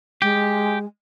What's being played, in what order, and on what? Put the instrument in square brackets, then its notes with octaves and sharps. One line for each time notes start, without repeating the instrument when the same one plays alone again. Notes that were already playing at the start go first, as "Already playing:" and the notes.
[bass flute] G#3 [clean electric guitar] G4